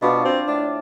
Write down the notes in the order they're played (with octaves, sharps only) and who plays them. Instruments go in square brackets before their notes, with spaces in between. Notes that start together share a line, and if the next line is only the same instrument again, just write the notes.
[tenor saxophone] B2 [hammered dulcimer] D4 F4 C5
[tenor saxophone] C4
[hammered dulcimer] A2 [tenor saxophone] D4